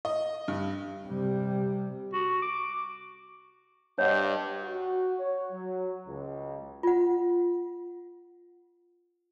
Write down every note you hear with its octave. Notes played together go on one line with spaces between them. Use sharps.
D#5
G2
C3 G3
F#4
D6
G2 C#5 D#5 F#5
F#4
C#5
F#3
C#2
F4 F#5